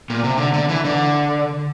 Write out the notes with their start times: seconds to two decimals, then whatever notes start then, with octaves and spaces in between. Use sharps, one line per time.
0.10 A#2
0.24 C3
0.37 D3
0.54 D3
0.69 E3
0.85 D3